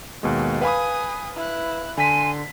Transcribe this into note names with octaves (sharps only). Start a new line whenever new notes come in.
D#2 B2 G#3
B4 F5 G#5 B5 D#6
E4 F#6
D3 G#5 C6 B6